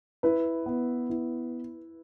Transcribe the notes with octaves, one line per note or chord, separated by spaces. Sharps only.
E4 B4
B3
E4